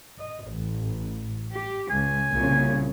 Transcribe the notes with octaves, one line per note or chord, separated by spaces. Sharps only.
D#5
A1
G4
C#2 G#5
C2 A#2 C#3